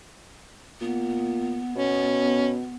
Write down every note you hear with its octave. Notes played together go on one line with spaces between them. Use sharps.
A#2 B3
B2 C#4